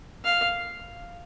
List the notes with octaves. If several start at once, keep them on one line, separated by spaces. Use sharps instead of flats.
F5